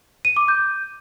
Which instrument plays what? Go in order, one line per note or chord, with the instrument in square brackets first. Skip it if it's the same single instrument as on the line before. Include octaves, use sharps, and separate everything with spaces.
[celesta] D#7
D6
G6